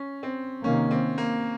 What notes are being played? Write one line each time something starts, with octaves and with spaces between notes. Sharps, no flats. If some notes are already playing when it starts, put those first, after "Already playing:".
Already playing: C#4
C4
C3 D#3 A#3 C#4
C4
A#3